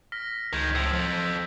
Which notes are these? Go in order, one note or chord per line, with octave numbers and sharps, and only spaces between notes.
F6 A#6 B6
C#2 D#3 G#3 G6 G#6 B6
A2 F3 E6 G#6 D7
F2 F3